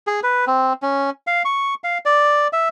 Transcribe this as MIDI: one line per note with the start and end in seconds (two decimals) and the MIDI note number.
0.07 0.20 68
0.23 0.45 71
0.47 0.73 60
0.82 1.10 61
1.27 1.43 77
1.45 1.74 85
1.84 1.98 77
2.06 2.48 74
2.53 2.69 76